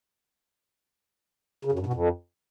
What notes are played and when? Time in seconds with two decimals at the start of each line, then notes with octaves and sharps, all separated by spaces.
1.65 C#3
1.72 F#2
1.79 G2
1.86 B2
1.93 F2